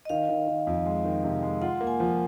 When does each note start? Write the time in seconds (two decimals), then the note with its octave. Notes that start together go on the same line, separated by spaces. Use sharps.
0.05 D#5
0.09 D#3 F5
0.29 D#3
0.47 D#3
0.67 F2
0.85 G#3
1.05 D#3
1.24 C3
1.43 G#3
1.62 F4 F#5
1.81 A#3
1.87 G#5
2.00 F3